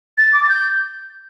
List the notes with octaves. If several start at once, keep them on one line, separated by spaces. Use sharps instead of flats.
A6
D6
A6
G6